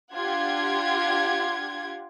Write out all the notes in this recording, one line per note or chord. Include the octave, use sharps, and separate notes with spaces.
D4 F4 G4 F#5 G#6